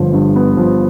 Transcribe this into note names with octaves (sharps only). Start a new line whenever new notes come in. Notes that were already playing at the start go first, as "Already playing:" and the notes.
Already playing: G1 F3
G2
B3
F3